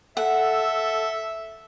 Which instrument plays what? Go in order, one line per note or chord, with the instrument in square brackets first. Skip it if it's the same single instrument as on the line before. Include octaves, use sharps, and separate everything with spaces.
[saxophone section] A4 [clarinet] E5 [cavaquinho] F#5